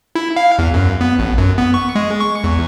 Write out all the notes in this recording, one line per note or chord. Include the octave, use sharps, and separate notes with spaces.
E4
F5
E2
F#2
B3
A1
F#2
B3
C#6
G#3
C#6
E2